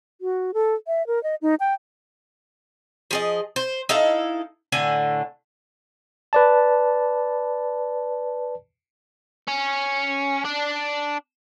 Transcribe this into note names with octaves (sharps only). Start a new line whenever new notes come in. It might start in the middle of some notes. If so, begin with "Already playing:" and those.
F#4
A4
E5
A#4
D#5
D#4
G5
F3 G#4 D#5
C5
D#4 E4 A4 F5
A2 D3 G#5
B4 D5 A5
C#4
D4